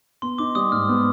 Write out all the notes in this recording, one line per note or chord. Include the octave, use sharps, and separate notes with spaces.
B3 C6
D#4 D6
G3 D#6
G#2 F6
B3